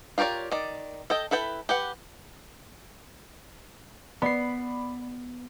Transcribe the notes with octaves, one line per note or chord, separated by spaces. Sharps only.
F4 G4 A#4 C#5 D5
D#3 D5
A4 D#5 G5
E4 A4 B4 G5
G4 B4 F#5
B3 D5 B5 C7